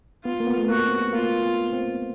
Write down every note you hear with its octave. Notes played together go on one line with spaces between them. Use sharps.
B3 F4
A#3
B3
A3
A#3 F#4
C4
B3
A#3 F4
B3
C4